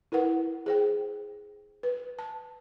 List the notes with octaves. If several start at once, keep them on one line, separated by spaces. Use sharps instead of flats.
E4 A#4 B4 F#5
G#4 C5 G5
B4
A5